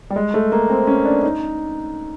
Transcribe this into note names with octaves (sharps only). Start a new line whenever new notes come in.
G3
G#3
A3
A#3
C4
C#4
D4
D#4